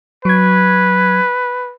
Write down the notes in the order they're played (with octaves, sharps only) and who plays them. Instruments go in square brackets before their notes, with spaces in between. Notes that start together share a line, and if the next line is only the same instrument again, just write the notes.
[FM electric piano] F#3 G#6 [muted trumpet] B4